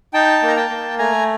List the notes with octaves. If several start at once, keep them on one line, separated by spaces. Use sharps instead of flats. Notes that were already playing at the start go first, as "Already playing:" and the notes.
D#4 G5 A5
A#3
A#5
G5 A5
A#3
A3 G#5 A#5